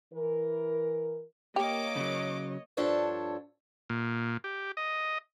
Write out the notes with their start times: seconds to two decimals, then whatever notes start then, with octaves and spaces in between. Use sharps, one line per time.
0.12 E3 A#4
1.56 A#3 G4 C#5 D#5 D6
1.96 C#3 F#3
2.77 G2 F3 D4 A4 C#5 A5
3.89 A#2
4.44 G4
4.77 D#5